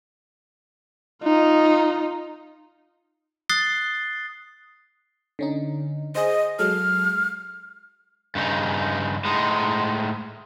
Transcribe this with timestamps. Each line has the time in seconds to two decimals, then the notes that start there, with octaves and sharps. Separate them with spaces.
1.23 D#4 F4
3.49 D#6 F#6 A6 C7 G7
5.39 D3 C#4 D#4
6.15 G#4 C5 D#5
6.59 F#3 G#3 A4 F6
8.35 G2 C#3 D#4
9.25 A2 G#3 D#4